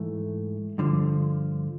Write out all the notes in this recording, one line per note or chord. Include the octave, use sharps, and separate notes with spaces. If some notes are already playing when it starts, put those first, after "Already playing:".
Already playing: G#2 E3 A3
G2 D3 F3